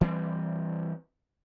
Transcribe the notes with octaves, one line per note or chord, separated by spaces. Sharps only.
E3 G3 C4